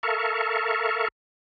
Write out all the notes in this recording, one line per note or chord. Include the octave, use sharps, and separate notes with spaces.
A4 A#4 E5 F5 C#6